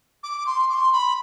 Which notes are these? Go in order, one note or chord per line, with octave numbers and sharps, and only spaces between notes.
D6
C6
D6
C6
B5